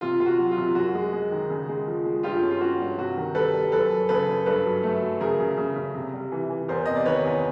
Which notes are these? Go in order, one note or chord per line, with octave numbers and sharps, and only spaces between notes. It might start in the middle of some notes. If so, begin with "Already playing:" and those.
C3 F4
C3 F4
F#4
F#3
F4
C3
F#2 F#4
G#3
G#3
D#3
C#3
G#3
F3
G#3
G2 F4 G4
C#4
F4
C#4 F#4
G2
C3 F#4
D#3
G3 A4 B4
G3
F#2 A4 B4
F#2
C#3 A4 B4
F#2
G2 A4 B4
F#3
A3
F#3
C#3 G#4 A#4
C#3
C#3
C#3
C3
G3
E3
E3
E2 A#4 C5
C3 D#5
D5
D#3 B4 C#5
E2